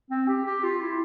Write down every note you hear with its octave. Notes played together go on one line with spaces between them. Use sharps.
C4
G4
G4
F4
E4